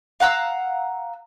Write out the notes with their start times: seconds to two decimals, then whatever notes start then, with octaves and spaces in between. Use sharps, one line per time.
0.20 F5 F#5 A#5 E6